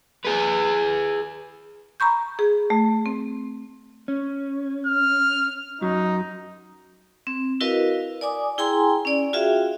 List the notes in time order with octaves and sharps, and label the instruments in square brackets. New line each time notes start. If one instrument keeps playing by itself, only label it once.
[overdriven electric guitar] G#4 B4
[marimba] A#5 B5 C#6 G6
G#4
A3
C4
[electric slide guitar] C#4
[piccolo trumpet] F6
[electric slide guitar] F#2 F#3 [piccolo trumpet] D#4
[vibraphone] C4
E4 F#4 A#4 B4 D#5 F5
D5 G#5 D6 D#6
E4 G#4 G5 G#5 A#5 C6
C#4 D5
F4 F#4 G#4 E5 F5 G5